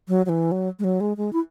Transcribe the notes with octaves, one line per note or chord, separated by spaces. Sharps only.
F#3
F#3
E3
F#3
G#3
F#3
G#3
G#3
E4